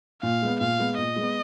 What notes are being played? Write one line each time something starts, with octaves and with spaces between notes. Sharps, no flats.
A#2 F5
G#3 B3
A#2 F5
G#3 B3
A#2 D#5
G#3 B3